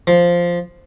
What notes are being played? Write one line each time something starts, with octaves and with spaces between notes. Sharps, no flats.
F3